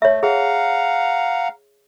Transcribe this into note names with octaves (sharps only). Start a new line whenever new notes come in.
A3 C#5 E5
G#4 F5 F#5 A#5